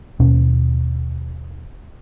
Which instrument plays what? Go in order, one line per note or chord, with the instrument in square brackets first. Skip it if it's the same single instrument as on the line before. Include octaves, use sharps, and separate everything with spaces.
[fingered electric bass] D#2 B2 C#4